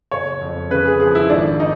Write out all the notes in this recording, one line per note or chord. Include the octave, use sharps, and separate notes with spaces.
F#1 C#5
F2
C#3 B4
G#4
F3 G#4
E4
G#1 D4
D#4